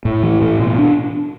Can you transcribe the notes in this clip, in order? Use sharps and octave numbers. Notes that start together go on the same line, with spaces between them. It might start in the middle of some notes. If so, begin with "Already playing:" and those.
A2
E3
A2
B2
D4